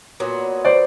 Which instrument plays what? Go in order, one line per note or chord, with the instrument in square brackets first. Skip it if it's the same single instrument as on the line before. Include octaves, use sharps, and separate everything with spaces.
[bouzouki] A#2 F#3 B3
[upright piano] C5 D5